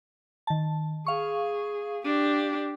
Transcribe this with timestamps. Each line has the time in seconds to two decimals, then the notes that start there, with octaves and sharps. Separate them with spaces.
0.47 D#3 A5
1.06 G#4 F5 C#6
2.05 D4 G4